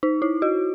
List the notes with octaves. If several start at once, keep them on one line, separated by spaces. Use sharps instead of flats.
D#4
E4
F#4